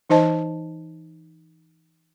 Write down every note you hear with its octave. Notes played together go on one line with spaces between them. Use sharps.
E3 D#4 C5 D#5 A5